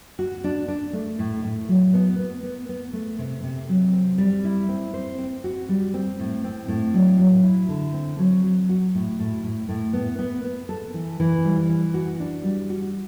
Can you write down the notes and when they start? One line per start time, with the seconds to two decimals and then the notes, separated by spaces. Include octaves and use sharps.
0.19 F#4
0.44 D4
0.68 D4
0.93 A3
1.19 A2
1.44 A2
1.69 F#3
1.94 B3
2.19 B3
2.43 B3
2.69 B3
2.93 A3
3.19 C3
3.44 C3
3.69 F#3
3.93 C4
4.18 G3
4.44 E4
4.69 C4
4.94 C5
5.18 C4
5.44 F#4
5.69 G3
5.94 C4
6.19 A2
6.44 C4
6.68 A2
6.94 F#3
7.19 F#3
7.43 E4
7.69 D3
7.94 C4
8.19 F#3
8.44 F#3
8.69 F#4
8.95 A2
9.20 A2
9.44 A2
9.69 A2
9.93 B3
10.19 B3
10.44 B3
10.69 A4
10.94 E3
11.20 E3
11.45 G3
11.69 E3
11.94 F#4
12.20 D4
12.44 G3
12.70 F#4